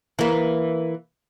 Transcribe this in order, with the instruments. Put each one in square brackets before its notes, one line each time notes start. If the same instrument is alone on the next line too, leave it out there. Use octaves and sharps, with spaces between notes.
[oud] E3 A#3